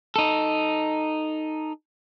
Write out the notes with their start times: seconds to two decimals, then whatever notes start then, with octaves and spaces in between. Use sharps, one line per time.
0.16 D#4 A4